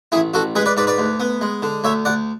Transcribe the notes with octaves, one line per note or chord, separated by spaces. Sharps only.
A1 E4 G#4
A1 F#4 A4
G#3 G#4 B4
B4 D5
G#2 B4 D5
B4 D5
D2
B3
G#3
D3
D2 C#5 E5
D2 D5 F#5